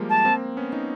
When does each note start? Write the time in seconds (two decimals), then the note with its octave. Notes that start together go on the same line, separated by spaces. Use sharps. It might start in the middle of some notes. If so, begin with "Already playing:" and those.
Already playing: F3 G3 G#3 A#3
0.09 A5
0.25 A#3 C4
0.57 B3 C#4
0.73 C#4 D#4